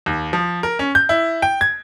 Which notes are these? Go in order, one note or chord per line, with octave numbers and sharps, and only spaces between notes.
D#2
F3
A#4
C#4
G6
E4
G5
G#6